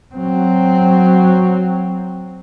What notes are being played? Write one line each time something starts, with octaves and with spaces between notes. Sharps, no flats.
F#3 C4